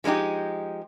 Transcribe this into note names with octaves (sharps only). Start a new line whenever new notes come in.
F3 G#3 D4 D#4 G4